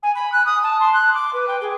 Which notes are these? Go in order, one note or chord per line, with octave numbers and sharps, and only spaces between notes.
G#5
B5
F#6
D#6
A5
C6
F#6
D6
B4
G5
G#4